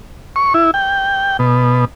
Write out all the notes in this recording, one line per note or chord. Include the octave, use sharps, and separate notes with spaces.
C#6
E4
G5
B2